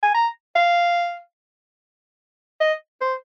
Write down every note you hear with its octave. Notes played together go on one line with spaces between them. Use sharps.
G#5
A#5
F5
D#5
C5